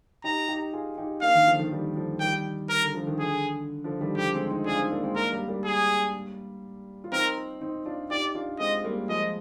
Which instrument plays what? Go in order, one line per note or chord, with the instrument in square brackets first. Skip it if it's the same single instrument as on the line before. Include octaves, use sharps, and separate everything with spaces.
[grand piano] D#4 G4 [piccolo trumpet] A#5
[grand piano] D#4 G4
F4 G#4
D#4 G4
[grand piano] A#3 D4 [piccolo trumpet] F5
[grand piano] D#3
D3 F3
D#3
D#3 G3
D3 F3
[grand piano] D#3 G3 [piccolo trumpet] G5
[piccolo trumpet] A#4
[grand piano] D3
D3 F3
D#3
[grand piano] D3 [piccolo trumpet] G#4
[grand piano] D3 F3
D#3 G3
[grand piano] D3 F3 [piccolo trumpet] G4
[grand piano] G#3 C4
C4 D#4
[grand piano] D4 F4 [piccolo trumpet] G#4
[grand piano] C4 D#4
A#3 D4
G#3 C4
[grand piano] A#3 D4 [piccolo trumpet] A#4
[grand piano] G3 A#3
G3 A#3
[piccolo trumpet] G#4
[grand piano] F4
[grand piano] C4 D#4 [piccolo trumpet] A#4
[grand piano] C4 D#4
D4 F4
[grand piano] D#4 G4 [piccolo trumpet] D5
[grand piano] D4 F4
[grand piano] G#3 C4 [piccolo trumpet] D#5
[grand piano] G3 A#3
[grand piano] F3 G#3 [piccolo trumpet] D#5